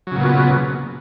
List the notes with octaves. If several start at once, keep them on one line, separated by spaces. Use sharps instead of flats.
A#2 C#3 F#3 B3